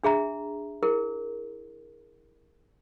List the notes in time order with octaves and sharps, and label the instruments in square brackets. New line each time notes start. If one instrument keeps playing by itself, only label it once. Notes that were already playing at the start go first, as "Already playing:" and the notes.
[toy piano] D4 G#4 E5 A#5
E4 G#4 A#4